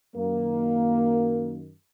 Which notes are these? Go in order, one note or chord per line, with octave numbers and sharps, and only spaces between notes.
F#2 D#3 A#3